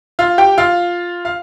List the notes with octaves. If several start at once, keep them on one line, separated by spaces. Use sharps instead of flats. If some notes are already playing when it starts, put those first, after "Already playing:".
F4 F5
G4 G5
F4 F5
F5